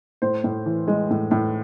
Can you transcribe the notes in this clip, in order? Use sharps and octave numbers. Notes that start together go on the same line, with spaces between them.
A2 C5
A2
E3
G#3
A2
A2